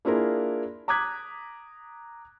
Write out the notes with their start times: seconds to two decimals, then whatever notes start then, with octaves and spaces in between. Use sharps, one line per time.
0.05 A#3 D4 E4 F4 G#4 A#4
0.88 A#5 D6 D#6 F#6 G#6 B6